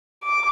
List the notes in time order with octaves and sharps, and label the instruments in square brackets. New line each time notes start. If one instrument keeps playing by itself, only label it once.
[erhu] D6